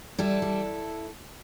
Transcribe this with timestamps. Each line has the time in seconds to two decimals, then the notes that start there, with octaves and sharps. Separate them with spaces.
0.18 G3 E4 A4
0.42 G3